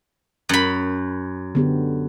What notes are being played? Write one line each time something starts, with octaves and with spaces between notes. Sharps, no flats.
F#2 B5
D3 B3 G4